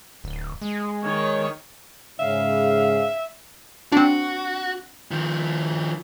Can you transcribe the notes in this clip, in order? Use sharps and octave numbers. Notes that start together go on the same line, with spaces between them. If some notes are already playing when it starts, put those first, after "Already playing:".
D1
G#3
D#3 D#4 C#5
G#2 C#3 E5 F5
C4 D4 F#4
D#3 F3